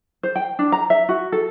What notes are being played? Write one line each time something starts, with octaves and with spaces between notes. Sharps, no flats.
C5
G5
D4
A#5
E5
F#4
A4